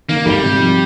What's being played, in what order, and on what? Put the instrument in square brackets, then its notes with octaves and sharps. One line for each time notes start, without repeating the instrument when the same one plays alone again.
[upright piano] D#3 [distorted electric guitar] A#3
[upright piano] G#1 [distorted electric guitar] G3
[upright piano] C3
F3